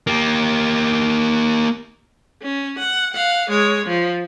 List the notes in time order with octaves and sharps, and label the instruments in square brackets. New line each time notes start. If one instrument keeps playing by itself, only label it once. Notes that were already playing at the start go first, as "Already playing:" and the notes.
[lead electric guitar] A#3 G4
[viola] C#4
F#5
F5 F#5
G#3 C#5
F3